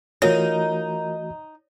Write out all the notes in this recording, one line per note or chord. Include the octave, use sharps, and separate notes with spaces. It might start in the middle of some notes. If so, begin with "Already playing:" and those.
E3 A3 D#4 F4 F#4 A#4 C#5